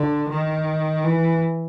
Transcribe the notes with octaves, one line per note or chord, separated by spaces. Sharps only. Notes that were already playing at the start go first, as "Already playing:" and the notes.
Already playing: D3
D#3
E3